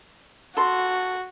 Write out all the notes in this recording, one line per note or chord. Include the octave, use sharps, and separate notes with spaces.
F#4 A4 C6